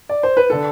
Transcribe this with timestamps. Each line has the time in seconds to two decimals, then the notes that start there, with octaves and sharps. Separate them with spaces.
0.09 D5
0.23 C5
0.37 B4
0.50 D3 A4